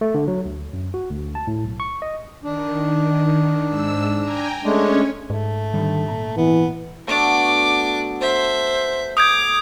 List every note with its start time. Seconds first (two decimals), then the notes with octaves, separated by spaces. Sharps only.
0.01 A3
0.14 D3
0.28 F#3
0.45 D2
0.73 F#2
0.94 F#4
1.11 D2
1.35 A5
1.47 A2
1.64 B1
1.80 C#6
2.02 D#5
2.44 D#3 D4
3.68 G#2 E6
4.21 G5 G#5 A#5
4.64 G#3 A3 C#4 D4 C#5
5.30 G#2 A3
5.74 D3 D#3 G3
6.08 A#2 A#5
6.37 E3 B3
7.07 A3 B3 D4 F#4 D6
8.21 A4 C5 E5
9.17 D6 D#6 G6 G#6